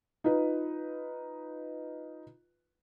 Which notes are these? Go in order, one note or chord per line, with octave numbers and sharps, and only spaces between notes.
D#4 F4 B4